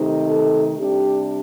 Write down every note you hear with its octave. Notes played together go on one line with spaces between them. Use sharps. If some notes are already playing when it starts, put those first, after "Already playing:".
Already playing: C3 D#3 A3 D#4
A4
C3 G3 D4 G4